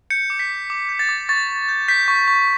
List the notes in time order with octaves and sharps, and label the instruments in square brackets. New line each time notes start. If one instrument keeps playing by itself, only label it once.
[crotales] G6 C#7
D6
B6
D6
D6
G6
A6
D6
C#6 A6
C#6
G6
G6 B6
C#6
C#6